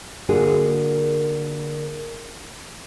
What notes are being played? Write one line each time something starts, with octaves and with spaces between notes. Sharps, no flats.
D3 A#3 D4 F4 F#4 G#4